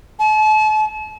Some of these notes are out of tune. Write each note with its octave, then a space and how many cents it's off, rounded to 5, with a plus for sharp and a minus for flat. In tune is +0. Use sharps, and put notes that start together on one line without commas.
A5 -40